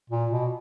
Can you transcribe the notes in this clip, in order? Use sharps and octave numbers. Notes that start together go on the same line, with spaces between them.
A#2
B2